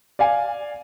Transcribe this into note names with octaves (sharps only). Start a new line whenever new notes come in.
D5 F5 G#5